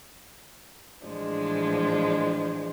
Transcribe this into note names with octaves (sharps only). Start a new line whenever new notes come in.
A2 E3 F3 G#3 D4